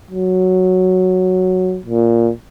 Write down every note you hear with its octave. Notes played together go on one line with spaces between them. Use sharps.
F#3
A#2